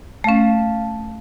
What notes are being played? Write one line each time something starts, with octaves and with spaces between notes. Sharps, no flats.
A3 C#4 F5 A5